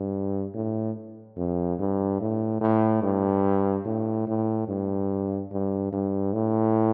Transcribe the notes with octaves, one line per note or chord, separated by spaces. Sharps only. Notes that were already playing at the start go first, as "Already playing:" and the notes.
Already playing: G2
A2
F2
G2
A2
A2
G2
A2
A2
G2
G2
G2
A2